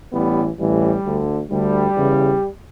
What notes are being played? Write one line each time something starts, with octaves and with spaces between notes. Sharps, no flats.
A1 A2 E3 G3 B3
A1 A2 E3 G3
D2 D3
D2 D3 G3
E2 C#3 E3